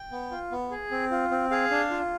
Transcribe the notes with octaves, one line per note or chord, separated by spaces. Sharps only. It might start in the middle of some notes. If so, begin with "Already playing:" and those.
Already playing: G5
B3
F4
B3
G#4
C4
F4
C4
G#4 F5
D4
F4